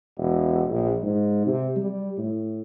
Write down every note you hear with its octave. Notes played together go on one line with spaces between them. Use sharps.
E1
A#1
G#2
C3
G3
A2